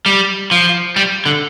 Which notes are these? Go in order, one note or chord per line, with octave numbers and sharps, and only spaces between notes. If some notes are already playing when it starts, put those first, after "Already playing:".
G3
F3
G3
D3